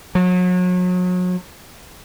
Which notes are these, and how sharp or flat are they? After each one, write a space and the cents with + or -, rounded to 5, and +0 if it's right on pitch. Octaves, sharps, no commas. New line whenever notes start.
F#3 -35